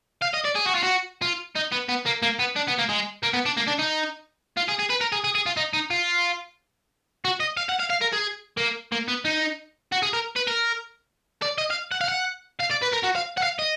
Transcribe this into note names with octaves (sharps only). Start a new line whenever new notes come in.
F5
D#5
D5
G#4
F#4
F4
F#4
F4
D#4
B3
B3
A#3
A#3
B3
D4
B3
A#3
G#3
A#3
B3
D4
A#3
D4
D#4
F4
G#4
G#4
B4
A#4
G#4
G#4
G#4
F4
D#4
D#4
F4
F#4
D#5
F5
F#5
F5
F5
A#4
G#4
A#3
A#3
B3
D#4
F#4
G#4
A#4
B4
A#4
D5
D#5
F5
F#5
F5
F#5
F5
D5
B4
A#4
F#4
F5
F#5
F5
D#5